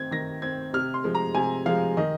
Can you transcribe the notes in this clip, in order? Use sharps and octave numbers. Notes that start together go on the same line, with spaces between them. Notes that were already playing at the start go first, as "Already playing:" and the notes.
Already playing: D#3 C4 G#6
D#3 A#6
C4 G#6
C3 F6
C6
F3 G#3
A#5
C3 G#5
F3 G#3 F5
D#3 D#5